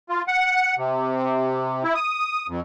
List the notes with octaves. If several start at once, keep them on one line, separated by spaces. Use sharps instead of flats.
F4
F#5
C3
E4
D#6
F2